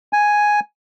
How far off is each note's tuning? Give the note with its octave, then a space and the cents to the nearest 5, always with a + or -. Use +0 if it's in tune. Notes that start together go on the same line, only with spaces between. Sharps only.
G#5 +0